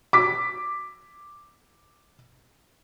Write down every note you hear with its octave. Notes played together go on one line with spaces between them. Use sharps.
D6 B6